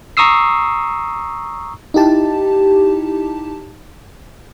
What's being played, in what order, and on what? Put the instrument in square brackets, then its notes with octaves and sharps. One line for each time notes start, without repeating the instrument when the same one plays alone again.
[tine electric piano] A#5 C#6 D#6 E6 C7
[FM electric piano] D#4 E4 G4 A5